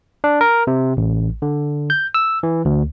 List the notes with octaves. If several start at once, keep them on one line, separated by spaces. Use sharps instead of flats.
D4
A#4
C3
A1
D3
G6
E6
E3
D2